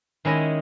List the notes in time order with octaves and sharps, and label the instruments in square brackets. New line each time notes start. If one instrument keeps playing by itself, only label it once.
[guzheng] D#3 G#3 C#4 E4 D#5